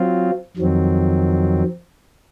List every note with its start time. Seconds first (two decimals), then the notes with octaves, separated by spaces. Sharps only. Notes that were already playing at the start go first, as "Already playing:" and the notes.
Already playing: F#3 C4 F4
0.57 F2 D#3 F#3 C4